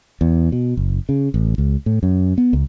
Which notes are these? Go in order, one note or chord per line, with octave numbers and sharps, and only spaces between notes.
E2
B2
F#1
C#3
A1
C#2
A2
F#2
B3
C#2